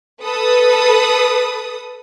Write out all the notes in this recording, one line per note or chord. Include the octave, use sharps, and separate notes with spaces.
A4 B4 D#6